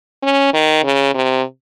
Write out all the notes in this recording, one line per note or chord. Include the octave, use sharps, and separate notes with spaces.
C#4
D#3
C#3
C3